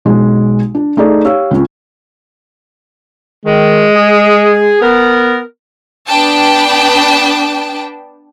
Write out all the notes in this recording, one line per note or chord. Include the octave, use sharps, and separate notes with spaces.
B1 G#3
D4
A3 D#4 G#4 D5
G4 C#5 F5 E6
C#2 C#3 C#4
D#3 G#3
G#4
B3 A#4
B3 D4 B4 G5 A5